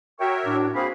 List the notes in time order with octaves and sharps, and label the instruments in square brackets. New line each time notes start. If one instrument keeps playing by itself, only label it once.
[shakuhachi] F#4 [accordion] A#4 C#5 E5 [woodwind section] G5 C#6
[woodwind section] A2 D4
[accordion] A#3 C4 G#4 [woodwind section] F#4 F5 B5 [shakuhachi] C5